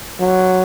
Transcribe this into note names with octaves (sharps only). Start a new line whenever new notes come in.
F#3